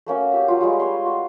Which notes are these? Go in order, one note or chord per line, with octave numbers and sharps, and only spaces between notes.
A3 A#3 C#4 F#4
F#4 G4 E5
F#3 F4
G3 G#3 F4
B4 C#5 C6
F#4